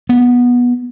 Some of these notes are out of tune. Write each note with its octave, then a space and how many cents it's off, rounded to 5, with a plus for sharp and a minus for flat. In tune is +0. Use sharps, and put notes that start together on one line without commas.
B3 -15